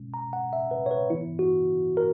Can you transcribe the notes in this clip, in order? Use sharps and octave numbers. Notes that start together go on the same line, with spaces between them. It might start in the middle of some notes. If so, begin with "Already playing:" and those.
Already playing: B2 G#3 C#4
A#5
F#5
E5
B4
C#5
B4
E3 B3 E4
F#4
A#4